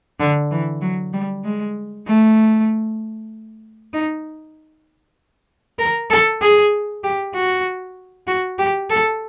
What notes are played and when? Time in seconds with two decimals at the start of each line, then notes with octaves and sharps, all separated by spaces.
0.20 D3
0.51 E3
0.82 F#3
1.14 G3
1.44 G#3
2.07 A3
3.93 D#4
5.79 A#4
6.10 A4
6.42 G#4
7.04 G4
7.35 F#4
8.27 F#4
8.59 G4
8.90 A4